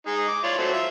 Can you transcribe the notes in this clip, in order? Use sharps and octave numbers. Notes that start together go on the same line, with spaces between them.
G#3 D#4 G#4
D6
F4 C#5 D5
F#3 A3 C4
F4 E5